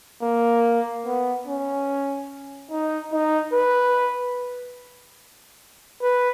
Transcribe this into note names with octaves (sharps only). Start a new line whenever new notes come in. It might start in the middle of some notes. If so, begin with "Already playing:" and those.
A#3
B3
C#4
D#4
D#4
B4
B4